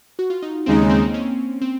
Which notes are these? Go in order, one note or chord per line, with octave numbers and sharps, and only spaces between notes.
F#4
F4
D#4
D#2 C#3 G#3 C4 D#4
A#3
C4
C#4
C#4
C4